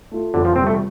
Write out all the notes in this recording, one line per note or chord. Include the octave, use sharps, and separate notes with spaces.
A3 F4
F2 D3
F3
C3 G3 C4 F4
A3